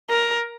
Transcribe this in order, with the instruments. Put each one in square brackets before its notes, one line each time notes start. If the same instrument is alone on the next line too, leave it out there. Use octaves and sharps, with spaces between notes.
[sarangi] A#4